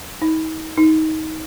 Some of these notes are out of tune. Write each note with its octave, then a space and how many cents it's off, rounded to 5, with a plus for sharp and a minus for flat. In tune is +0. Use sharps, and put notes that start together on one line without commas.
D#4 +40
D#4 +20